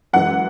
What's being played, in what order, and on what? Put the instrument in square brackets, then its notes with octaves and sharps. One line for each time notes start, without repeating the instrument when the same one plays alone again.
[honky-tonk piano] F#2 E3 G#3 F#5